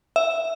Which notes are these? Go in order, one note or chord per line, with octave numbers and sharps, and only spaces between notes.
E5